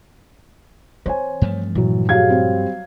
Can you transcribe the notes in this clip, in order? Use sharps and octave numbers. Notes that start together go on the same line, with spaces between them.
E3 C4 C5 C#5 G#5
G2 F3 A3
A#2 E3 F#3
F#3 G4 G#4 F5 G#6
G3 C4